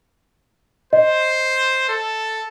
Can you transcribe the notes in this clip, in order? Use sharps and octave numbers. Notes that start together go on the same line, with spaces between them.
C5 D#5
A4